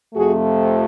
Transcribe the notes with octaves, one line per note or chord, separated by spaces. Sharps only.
F2 C3 F3 A3 F#4 G#4